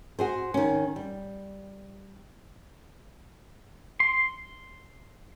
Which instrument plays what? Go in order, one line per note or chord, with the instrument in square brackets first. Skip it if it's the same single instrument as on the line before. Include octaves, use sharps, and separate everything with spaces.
[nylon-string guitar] F#4 G#4 C5
D#3 C#4
G3
[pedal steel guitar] C6